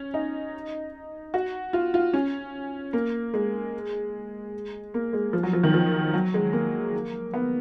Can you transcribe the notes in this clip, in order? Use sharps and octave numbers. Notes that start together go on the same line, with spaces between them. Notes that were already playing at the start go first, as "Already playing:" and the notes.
Already playing: C#4
D#4
F#4
F4
F4
C#4
A#3
G#3
A#3
G#3
F3
F#3
F3
D#3
F3
F#3
G#3
A#3
B3